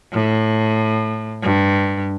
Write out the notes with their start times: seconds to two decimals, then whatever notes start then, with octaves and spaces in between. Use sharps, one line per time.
0.13 A2
1.42 G2